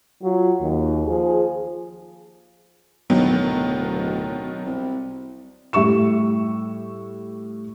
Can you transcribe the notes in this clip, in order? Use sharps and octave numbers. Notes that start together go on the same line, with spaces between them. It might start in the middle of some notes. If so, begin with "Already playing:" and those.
F#3 F4
D#2
F3 G#4
D1 B2 D#3 F#3
C2
A2 G3 E5 C#6 E7